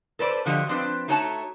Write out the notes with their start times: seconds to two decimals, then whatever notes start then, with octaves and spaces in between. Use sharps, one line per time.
0.19 A4 B4 C5 D5
0.46 D3 F3 F#4 G4 D#5
0.68 F3 C4 D4 B4
1.08 A3 D#4 F#4 C#5 G#5 A5